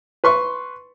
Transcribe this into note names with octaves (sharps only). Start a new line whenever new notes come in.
B4 C6 C#6